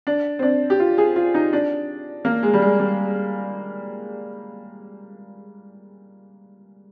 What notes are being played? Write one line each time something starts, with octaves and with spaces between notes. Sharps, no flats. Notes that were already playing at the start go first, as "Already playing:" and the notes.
D4
C4
D4
G4
F4
G#4
F4
D#4
D4
A#3
G#3
G3
G#3
G3